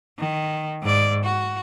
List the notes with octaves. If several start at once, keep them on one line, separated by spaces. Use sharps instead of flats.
D#3
G#2 D5
F#4